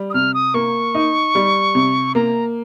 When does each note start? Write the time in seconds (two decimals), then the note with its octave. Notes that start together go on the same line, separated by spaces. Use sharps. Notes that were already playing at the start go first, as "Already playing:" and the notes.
Already playing: G3
0.10 D#6
0.14 C3 F6
0.34 D#6
0.54 A#3 C#6
0.95 D#4
1.35 G3
1.75 C3
2.15 A#3 A#5